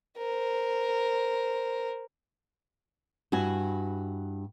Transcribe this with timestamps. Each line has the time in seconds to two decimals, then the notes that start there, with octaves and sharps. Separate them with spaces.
0.18 A#4 C5
3.32 G2 E4 F#4 G#5